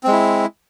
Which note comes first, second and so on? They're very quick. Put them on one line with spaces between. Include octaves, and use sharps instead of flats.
C4 G#3 E4